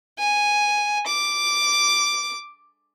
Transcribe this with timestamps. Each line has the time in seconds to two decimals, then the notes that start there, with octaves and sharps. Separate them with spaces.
0.19 G#5
1.07 D6